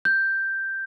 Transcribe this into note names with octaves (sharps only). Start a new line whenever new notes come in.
G6